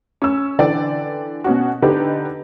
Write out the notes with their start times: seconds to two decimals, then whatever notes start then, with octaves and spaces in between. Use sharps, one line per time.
0.22 C#4 E6
0.59 D3 E3 D5 G5
1.44 B2 C#4 F#4
1.82 D3 D#4 G4 B4